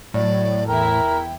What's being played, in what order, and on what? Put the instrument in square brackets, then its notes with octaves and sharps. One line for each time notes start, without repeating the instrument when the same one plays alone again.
[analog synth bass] A2 [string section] F#3 [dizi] D5
[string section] E2 E4 [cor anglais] A#4 [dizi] G5